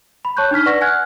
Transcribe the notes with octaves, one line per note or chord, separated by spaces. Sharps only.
B5
C#5 A5 C#6 F#6 G6
D4 D#4 F6 B6
B4 D5 F#5 C#6 A#6 B6
F#5 G#5 F6 F#6 G#6